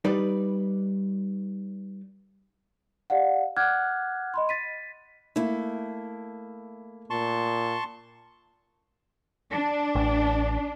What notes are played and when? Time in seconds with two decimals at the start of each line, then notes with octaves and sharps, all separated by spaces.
0.05 G3 D#4 B4 D5
3.10 G4 D5 F5 F#5
3.57 F#5 D6 F6 F#6 G#6
4.34 D#5 B5 C6
4.49 A6 B6 D#7
5.36 A3 A#3 E4
7.10 A#2 A5 C6 C#6
9.51 D4
9.95 A1